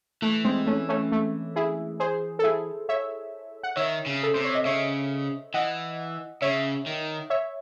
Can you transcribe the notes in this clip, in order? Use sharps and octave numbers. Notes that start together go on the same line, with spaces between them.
E3 A3
G#3 C4
A3 C#4
A3 C#4
A3
E4 G#4
G#4 C5
A4
E4 G#4
C#5 E5
F#5
D#3 C#5 E5
C#3
A4
C3 C5
C#5
D#5
C#3 C#5 E5
E3 D#5 F#5
C#3 C#5 E5
D#3
C#5 E5